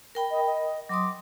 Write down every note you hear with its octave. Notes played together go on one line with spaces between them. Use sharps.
A#4 G5 B5
D#5
D#5
F#3 C6 D6 D#6